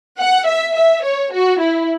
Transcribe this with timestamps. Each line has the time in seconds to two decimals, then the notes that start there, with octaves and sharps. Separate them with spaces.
0.20 F#5
0.48 E5
0.77 E5
1.05 C#5
1.33 F#4
1.61 E4